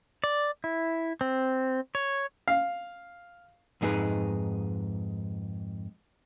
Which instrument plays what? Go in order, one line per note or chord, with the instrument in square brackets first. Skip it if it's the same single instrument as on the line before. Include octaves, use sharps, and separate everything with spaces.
[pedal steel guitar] D5
E4
C4
C#5
[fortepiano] F5
[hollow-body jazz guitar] F2 G#2 D#4 G#4 B4